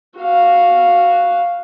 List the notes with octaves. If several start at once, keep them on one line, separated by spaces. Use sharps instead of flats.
F#4 F5